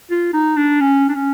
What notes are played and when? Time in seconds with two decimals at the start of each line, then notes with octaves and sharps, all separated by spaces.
0.11 F4
0.33 D#4
0.57 D4
0.81 C#4
1.09 D4
1.15 C#4